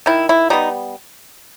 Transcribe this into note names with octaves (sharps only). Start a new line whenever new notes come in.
D#3 E4
E4
G3 B3 D#4